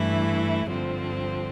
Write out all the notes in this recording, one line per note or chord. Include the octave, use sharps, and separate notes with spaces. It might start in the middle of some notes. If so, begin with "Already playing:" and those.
Already playing: G2 E3 A3 E4
G2 D3 F3 C4